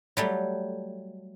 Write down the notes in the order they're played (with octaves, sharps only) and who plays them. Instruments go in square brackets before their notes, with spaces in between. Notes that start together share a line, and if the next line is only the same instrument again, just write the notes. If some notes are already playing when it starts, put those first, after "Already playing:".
[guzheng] F#3 G3 A3